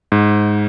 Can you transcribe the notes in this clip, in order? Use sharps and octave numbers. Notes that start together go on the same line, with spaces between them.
G#2